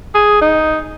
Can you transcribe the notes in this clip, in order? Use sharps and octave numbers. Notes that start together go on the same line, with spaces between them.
G#4
D#4